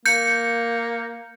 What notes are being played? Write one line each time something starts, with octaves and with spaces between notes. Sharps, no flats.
A#3 G6 C#7